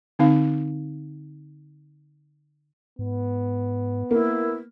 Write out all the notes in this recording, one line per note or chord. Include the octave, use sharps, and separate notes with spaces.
D3 C4 D#4 F5
G#2 B3
A#3 E4